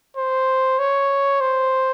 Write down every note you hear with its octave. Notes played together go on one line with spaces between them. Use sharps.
C5
C#5
C5